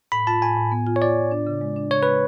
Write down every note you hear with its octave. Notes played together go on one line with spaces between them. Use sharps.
A2 B5
F4 A5
A2 G#5
A2
B3
F4
C#5
F4 D5
A2
D4
C#3
G#3
D4
C#3 C#5
G#3 B4